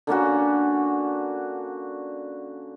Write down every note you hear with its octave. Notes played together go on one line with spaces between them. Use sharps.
D3 A#3 C#4 F#4